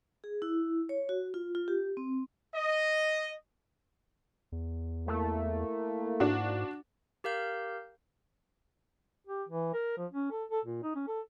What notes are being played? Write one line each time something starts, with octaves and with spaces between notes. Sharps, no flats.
G#4
E4
C#5
F#4
F4
F4
G4
C4
D#5
E2
A3 A#3 E4
G#2 D4 F#4
G4 A#4 F5 G6
G4
E3
A#4
F3
C#4
A4
A4
A#2
D#4
C#4
A4